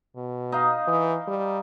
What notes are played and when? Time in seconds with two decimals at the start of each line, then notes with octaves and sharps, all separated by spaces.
0.16 B2
0.52 D#4 D#5 F5
0.88 E3
1.27 G3